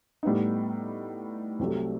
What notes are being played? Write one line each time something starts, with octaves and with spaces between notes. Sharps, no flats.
A2 G3 B3 D#4
C2 C3 F#3 A3